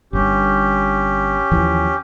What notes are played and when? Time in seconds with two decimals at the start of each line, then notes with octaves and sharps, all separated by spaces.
0.13 G1 G2 C#4 G4
1.51 D#2 E3 F3